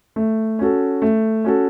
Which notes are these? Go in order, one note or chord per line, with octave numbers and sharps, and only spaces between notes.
A3
C#4 F#4 A4
A3
C#4 F#4 A4